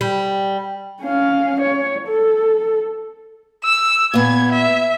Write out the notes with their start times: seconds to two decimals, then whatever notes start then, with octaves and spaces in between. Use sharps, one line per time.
0.01 G3
1.01 C#4 F5
1.62 C#5
2.08 A4
3.64 E6
4.14 A#2 B3 G#6
4.52 E5